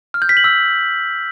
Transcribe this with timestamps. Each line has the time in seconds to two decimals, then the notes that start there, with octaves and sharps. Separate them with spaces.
0.14 F6
0.22 G6
0.29 B6
0.37 F#7
0.44 E6